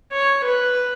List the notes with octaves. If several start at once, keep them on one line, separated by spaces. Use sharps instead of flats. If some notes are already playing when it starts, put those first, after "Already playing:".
C#5
B4